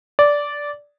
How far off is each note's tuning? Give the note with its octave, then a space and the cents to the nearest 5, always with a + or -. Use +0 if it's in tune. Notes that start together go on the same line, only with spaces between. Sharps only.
D5 -10